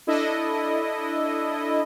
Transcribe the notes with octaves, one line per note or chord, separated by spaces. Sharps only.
D4 E4 A4 D#5